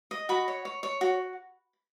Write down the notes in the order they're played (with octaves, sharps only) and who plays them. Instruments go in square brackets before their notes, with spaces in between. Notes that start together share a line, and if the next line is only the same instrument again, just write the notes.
[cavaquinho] D#5
F#4 B5
C#5
C#5
C#5
F#4